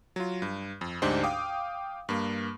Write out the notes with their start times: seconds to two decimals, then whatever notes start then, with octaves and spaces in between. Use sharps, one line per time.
0.16 F#3 F4
0.42 G2
0.81 F2
1.02 D2 G#2 D4 D#4 G4 C5
1.23 F5 G5 D6 D#6
2.09 G2 A#3